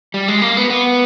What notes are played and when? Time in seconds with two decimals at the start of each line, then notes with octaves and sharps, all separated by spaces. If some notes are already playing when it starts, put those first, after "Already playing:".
0.14 G3
0.28 G#3
0.42 A#3
0.57 B3
0.70 B3